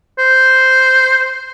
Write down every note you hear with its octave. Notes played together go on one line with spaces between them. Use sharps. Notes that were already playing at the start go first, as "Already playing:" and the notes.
C5